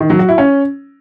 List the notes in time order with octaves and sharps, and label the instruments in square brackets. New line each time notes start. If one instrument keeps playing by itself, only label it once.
[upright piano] D#3
F#3
F#4
E4
C#4